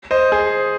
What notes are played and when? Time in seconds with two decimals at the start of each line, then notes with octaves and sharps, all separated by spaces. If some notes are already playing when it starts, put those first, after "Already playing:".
0.11 C5 D#5
0.32 G#4 C5